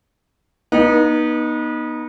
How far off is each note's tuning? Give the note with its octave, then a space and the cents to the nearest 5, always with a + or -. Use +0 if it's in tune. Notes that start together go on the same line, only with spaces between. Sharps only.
B3 -35 D#4 -10